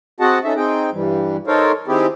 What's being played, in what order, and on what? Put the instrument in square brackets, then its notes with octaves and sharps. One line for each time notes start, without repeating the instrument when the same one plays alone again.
[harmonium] C4 F#4 G#4 D#5 F#5 A5
C#4 D#4 A4 E5
C4 D#4 G#4 G5
G2 E3 G3
D#4 A4 A#4 C5 C#5 F5
D#3 C4 E4 G4 G#4